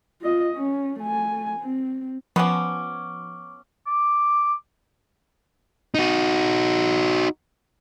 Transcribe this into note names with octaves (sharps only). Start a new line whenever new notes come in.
F4 D#5
C#4
A3 G#5
C4
F3 B3 C#4 C#6 D6
D6
D#4 F#4